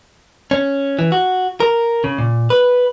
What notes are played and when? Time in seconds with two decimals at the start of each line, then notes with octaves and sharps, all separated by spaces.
0.51 C#4
0.99 E3
1.12 F#4
1.60 A#4
2.04 C#3
2.18 A#2
2.50 B4